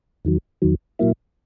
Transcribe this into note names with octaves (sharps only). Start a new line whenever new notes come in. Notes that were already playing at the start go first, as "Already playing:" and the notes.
E2 D#3 F#3
E2 D#3 F#3
A#2 F#3 A#3 E4